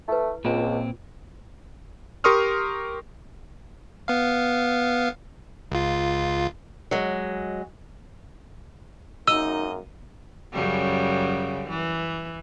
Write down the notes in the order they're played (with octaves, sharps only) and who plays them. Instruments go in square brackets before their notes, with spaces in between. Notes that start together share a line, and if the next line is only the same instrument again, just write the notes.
[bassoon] A3 [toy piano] E4 B4
[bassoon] C#2 [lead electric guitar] A#2 C4 [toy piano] F4
[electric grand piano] G4 A#4 C6 C#6 D#6 F6
[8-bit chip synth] B3 F5
C#2 F4
[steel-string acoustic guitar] F#3 G#3
[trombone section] G#1 F#2 A#3 [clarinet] D#4 [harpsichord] D#5 [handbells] E6
[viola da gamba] F#2 C#3 G3
E3